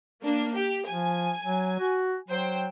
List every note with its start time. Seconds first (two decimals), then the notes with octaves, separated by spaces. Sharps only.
0.22 A#3 D4
0.55 G4
0.88 F3 G#5
1.43 F#3
1.80 F#4
2.29 F#3 C5 G5